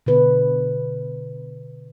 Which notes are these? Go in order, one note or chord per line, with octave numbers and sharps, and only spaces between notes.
B2 D3 B4